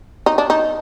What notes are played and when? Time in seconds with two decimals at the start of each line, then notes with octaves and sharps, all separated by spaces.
0.26 D#4
0.38 D4
0.50 D#4